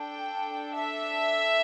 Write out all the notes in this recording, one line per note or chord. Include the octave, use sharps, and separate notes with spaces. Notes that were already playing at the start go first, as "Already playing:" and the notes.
Already playing: D4 A4 G5
E5